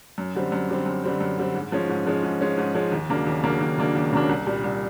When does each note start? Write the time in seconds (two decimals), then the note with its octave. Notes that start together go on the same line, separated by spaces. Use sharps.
0.18 F#2
0.35 D3 G3 C4
0.52 F#2
0.69 D3 G3 C4
0.86 F#2
1.04 D3 G3 C4
1.21 F#2
1.38 D3 G3 C4
1.55 G#2
1.72 F3 G#3 C#4
1.89 G#2
2.06 F3 G#3 C#4
2.23 G#2
2.41 F3 G#3 C#4
2.58 G#2
2.75 F3 G#3 C#4
2.92 D#2
3.10 C#3 F#3 A#3 D4
3.27 D#2
3.44 C#3 F#3 A#3 D4
3.61 D#2
3.78 C#3 F#3 A#3 D4
3.95 D#2
4.13 C#3 F#3 A#3 D4
4.29 C2
4.46 A#2 G3
4.64 C2